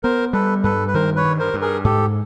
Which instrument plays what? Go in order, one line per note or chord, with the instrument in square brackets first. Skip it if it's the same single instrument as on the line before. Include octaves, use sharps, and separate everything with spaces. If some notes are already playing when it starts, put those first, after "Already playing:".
[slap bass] B3 [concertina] A#4 C5
[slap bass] G3 [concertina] A4 B4
[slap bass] G2 [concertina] A4 B4
[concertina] B4
[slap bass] D#3 [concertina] A#4 C5
[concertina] B4 C#5
[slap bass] G2
[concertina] A#4 C5
[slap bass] G2
[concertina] G#4 A#4
[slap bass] G#2 [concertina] G4 A4